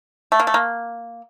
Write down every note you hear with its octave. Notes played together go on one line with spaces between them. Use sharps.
A3
A#3
A3
A#3